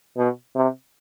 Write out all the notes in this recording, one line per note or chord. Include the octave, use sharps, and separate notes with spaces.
B2
C3